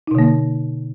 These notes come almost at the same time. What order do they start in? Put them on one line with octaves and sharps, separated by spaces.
D#4 B2 D3 A#3